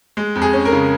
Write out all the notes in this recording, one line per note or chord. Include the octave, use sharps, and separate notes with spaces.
G#3
F2
G#4
C#4
A#4
C#3